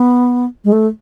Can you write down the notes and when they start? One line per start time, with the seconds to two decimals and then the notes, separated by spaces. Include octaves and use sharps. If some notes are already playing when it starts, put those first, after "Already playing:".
Already playing: B3
0.64 G#3
0.72 A3